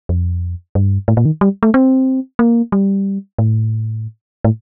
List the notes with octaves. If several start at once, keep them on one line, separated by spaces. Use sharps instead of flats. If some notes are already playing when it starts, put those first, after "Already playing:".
F2
G2
A2
A#2
D#3
G3
A3
C4
A#3
G3
A2
A2